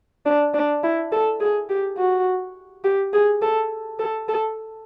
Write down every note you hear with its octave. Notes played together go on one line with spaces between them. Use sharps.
D4
D4
E4
A4
G#4
G4
F#4
G4
G#4
A4
A4
A4